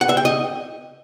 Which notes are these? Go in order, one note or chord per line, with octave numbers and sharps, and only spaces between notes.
F#5
E5
G5
D#5